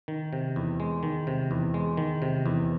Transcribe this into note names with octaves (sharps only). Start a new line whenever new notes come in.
D#3
C3
E2
G#3
D#3
C3
E2
G#3
D#3
C3
E2